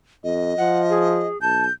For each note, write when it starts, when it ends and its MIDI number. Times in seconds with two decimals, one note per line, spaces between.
0.24 0.56 41
0.24 1.27 75
0.58 1.30 53
0.58 0.82 78
0.89 1.40 68
1.41 1.67 35
1.41 1.64 81
1.41 1.73 91